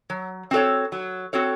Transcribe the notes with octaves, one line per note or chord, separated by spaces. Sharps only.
F#3
C4 F#4 A4 C#5
F#3
C4 F#4 A4 C#5